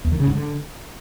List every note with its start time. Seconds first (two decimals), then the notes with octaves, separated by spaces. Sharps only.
0.04 E2
0.12 D#3
0.20 C#3
0.27 G#2
0.35 D3